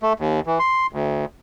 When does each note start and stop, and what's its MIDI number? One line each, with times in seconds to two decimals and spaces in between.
0.02 0.13 57
0.20 0.40 39
0.46 0.59 52
0.59 0.87 84
0.93 1.25 38